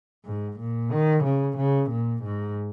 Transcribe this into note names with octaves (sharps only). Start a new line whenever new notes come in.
G#2
A#2
D#3
C#3
C#3
A#2
G#2